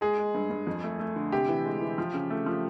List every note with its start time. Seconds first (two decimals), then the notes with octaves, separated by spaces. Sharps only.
0.01 G#3 G#4
0.18 G#3
0.35 G2
0.50 G2
0.67 F2
0.84 A3
0.99 A3
1.16 D3
1.32 C3 G4
1.48 E3
1.65 G#3
1.81 E3
1.98 F3
2.14 C#3
2.30 A3
2.46 F3